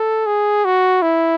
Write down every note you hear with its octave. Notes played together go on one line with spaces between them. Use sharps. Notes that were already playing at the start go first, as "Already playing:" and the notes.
Already playing: A4
G#4
F#4
E4